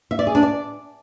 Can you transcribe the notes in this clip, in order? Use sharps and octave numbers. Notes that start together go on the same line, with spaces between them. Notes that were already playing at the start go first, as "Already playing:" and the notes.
E5
D5
G#4
D4
D5